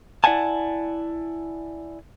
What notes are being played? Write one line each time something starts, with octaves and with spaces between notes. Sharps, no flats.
E4 D5 E5 F#5 G#5 A5